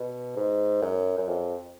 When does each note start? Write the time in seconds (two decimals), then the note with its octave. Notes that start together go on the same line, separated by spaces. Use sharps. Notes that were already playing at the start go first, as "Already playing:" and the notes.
Already playing: B2
0.37 G#2
0.83 F#2
1.18 F#2
1.29 F2